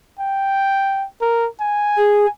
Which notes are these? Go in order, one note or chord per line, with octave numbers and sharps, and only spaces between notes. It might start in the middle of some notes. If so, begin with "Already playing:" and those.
G5
A#4
G#5
G#4